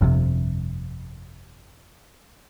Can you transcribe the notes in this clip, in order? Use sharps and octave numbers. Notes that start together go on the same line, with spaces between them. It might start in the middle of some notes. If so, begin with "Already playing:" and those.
G1 F2 A2 C3